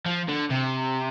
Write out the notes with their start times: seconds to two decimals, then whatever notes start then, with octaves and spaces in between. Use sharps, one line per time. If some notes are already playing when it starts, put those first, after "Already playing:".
0.06 F3
0.28 D3
0.50 C3